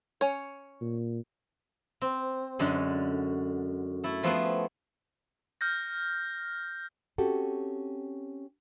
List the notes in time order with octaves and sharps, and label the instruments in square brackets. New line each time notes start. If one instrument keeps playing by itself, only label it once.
[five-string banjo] C#4 C#5
[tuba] A#2
[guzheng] C4
F#2 D3 G#3 C#5
A3 E4 A4
F3 A3 B3 G#4
[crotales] F6 G6 A#6
[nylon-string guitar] C4 C#4 F#4 G4 A4